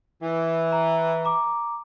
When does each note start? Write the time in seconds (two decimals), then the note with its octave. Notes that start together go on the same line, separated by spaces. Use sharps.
0.22 E3
0.72 A#5
1.25 A#5 D6